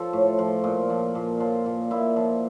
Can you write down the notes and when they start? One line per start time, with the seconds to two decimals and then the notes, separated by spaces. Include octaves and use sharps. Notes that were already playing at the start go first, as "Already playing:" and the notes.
Already playing: F3 F4 A4
0.13 A2
0.39 F3
0.64 A#2
0.90 F3
1.15 A#2
1.40 F3
1.66 A#2
1.91 A#2 E4
2.16 F3